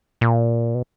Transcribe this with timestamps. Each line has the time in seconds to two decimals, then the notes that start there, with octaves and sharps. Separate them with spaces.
0.21 A#2
0.75 B2